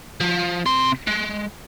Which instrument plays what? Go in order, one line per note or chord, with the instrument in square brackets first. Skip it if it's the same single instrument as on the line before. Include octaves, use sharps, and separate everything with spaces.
[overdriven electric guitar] F3
C3 C6
G#3